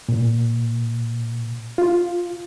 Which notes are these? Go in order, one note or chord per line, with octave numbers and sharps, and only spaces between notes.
A#2
F4